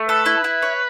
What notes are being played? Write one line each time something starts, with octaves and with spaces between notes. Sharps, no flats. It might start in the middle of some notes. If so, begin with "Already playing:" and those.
Already playing: A3
A4 B4
E4
E4
C#5